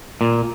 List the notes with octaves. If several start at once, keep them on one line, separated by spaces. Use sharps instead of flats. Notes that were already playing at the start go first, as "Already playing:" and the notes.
A#2